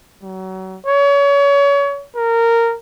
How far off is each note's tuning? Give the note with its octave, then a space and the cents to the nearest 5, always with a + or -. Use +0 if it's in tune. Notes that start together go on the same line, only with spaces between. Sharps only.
F#3 +30
C#5 +30
A#4 -15